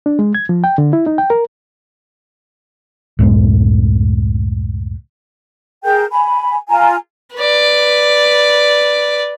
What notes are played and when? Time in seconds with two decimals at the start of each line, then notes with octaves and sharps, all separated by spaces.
0.06 D4
0.19 G#3
0.35 G#6
0.49 F3
0.64 G5
0.78 D3
0.93 E4
1.06 D#4
1.18 G5
1.30 A#4
3.19 C#2 F#2 A2 G#3
5.84 G#4 A#4 G5 G6
6.11 G#5 B5
6.69 F4 G#5 A#5
7.36 B4 D5